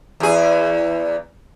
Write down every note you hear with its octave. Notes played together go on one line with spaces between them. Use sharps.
E2 G#4